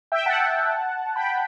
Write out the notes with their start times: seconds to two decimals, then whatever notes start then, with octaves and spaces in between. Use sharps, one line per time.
0.12 E5 G5
0.26 F#5 A5
1.16 G5 B5